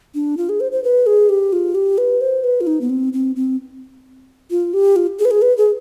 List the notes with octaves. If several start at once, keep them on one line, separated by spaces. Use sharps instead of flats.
D4
F4
G#4
C5
C5
B4
G#4
G4
F4
G4
B4
C5
B4
F4
D#4
B3
C4
C4
C4
F4
G4
F4
G#4
B4
G#4
B4
G#4